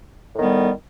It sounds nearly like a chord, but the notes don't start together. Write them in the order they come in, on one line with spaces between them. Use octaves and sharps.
A2 D#3 B3 G3